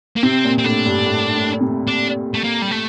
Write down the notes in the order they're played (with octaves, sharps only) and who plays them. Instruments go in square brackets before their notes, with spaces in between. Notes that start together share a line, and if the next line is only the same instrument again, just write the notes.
[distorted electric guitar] A#3
[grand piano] C3 [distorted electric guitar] C4
[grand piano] A#2
[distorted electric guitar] C4
[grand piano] A2 [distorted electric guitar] D4
[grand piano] G2
A2
A2
C3
[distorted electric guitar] D4
A3
A#3
G3
A3